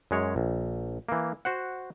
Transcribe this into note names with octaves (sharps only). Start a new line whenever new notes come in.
F#2 G#3 C#5
A#1
E3 A#3
F#4 C5 F#5